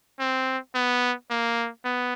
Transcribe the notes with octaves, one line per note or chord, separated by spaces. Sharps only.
C4
B3
A#3
B3